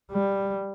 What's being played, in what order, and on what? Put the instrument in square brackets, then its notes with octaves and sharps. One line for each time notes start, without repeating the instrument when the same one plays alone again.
[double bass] G3